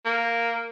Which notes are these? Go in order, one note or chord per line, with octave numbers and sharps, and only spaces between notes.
A#3